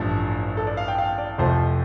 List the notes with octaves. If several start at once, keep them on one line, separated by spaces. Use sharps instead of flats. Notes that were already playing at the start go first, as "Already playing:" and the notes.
Already playing: A1 G2 F3 A3 A4
A4
D5
F5
G5
F5
D5
F1 F2 F3 A3 C5